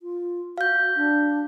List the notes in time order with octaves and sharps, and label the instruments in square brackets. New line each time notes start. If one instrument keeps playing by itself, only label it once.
[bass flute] F4
[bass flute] F#4 [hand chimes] F5 G6
[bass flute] D4